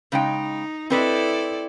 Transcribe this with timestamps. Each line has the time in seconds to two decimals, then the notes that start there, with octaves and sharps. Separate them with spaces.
0.12 C#3 G#3 D#4 G5
0.90 C4 E4 A4 B4 D5 D#5